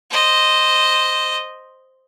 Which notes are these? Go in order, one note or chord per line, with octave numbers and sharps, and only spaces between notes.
C5 D#5